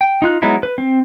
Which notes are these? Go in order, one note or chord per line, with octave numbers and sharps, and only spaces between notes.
G5
D#4 F4 F#6
F#3 G#3 B3 D#4 E4
B4
C4